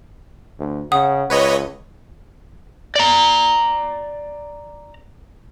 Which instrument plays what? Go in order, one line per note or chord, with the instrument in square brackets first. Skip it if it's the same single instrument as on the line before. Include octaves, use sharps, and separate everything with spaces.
[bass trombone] D2
[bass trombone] C#3 [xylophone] F#5 D#6
[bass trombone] C#2 [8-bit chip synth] B4 C#5 D#5
[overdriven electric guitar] D5 A#5